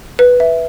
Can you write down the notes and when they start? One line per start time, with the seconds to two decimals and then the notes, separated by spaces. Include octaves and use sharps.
0.19 B4
0.40 E5